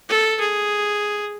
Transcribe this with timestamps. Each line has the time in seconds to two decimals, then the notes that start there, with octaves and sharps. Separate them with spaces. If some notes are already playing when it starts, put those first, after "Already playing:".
0.09 A4
0.40 G#4